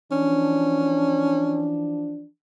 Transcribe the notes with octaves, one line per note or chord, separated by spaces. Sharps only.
E3 F3 C#4 D4